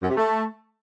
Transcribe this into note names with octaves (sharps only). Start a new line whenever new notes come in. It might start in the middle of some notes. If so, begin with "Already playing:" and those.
F#2
C3
A3